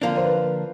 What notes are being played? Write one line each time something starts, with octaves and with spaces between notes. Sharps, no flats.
D3 F3 A#3 D4
C5
B4